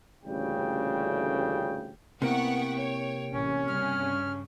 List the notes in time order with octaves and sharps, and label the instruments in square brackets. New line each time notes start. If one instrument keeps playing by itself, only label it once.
[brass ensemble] A1 D2 A#2 C#3 G3 G5
[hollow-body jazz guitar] C3 A#3 E4 [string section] B3 F#5 C#6 [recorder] G5
[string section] C#5
[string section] A1 [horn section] C#4
[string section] G2 C#3 [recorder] F6